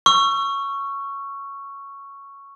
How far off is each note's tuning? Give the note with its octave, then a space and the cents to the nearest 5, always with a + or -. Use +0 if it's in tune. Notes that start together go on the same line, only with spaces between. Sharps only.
C#6 +0 E6 +35